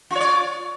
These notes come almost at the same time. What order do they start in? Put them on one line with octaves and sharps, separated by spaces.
F4 C#5 D5